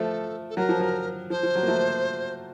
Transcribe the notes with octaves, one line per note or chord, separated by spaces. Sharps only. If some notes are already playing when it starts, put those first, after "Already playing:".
Already playing: F3 A3 A4
A4
F#3 A#4
F3
F#3
F3 C5
F3
F#3
A#3
F3 A3